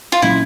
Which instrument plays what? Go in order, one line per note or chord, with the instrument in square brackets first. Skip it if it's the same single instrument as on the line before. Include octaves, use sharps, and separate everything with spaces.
[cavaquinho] F4
[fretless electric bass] A#2 F#3 A#3 C#4 [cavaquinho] E4